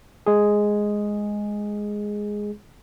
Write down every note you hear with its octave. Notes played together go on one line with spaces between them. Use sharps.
G#3 G#4